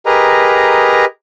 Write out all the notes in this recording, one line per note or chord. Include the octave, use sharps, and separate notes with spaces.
G4 G#4 A#4 B4 D#5 A#5